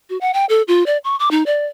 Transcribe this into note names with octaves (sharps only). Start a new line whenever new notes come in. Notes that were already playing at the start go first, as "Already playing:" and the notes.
F#4
F#5
G5
A4
F4
D5
C#6
D6
D#4
D5